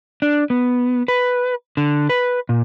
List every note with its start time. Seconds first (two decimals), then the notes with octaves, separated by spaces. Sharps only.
0.22 D4
0.50 B3
1.08 B4
1.77 D3
2.10 B4
2.49 A#2